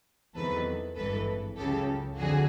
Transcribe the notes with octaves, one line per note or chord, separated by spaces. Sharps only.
E2 C3 D#3 F#3 A4 B4
G#1 G2 E3 A4 B4
C#2 C#3 F#3 G4 A4
F2 D3 F#4 G#4